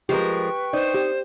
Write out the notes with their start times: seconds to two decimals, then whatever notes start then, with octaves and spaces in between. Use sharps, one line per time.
0.09 F3 G#3 G4 A#4 B4 G5 C#6
0.73 D#4 C5 D5
0.94 G4